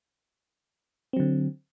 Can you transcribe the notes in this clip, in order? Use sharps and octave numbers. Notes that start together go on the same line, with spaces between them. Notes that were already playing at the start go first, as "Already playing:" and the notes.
D3 F#3 C4